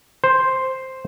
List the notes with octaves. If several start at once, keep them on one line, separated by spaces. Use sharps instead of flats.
C5